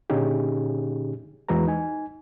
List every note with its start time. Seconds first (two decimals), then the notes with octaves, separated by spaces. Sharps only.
0.10 A#2 D3 C#4 D#4 G4 G#4
1.49 E2 E3 G#3 F#4 B4 A#5
1.67 D#4 G#5